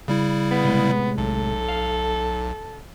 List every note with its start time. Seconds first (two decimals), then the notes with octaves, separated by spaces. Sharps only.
0.08 C#3 G3 E4
0.51 B3
0.63 A2 C3 G#3
1.18 B1 A4
1.69 F5